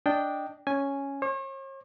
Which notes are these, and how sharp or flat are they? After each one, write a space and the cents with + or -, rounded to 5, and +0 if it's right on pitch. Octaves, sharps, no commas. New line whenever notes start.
D4 +0 D#5 -5 G5 +0
C#4 +0 G#5 +0
C#5 -45 D6 -5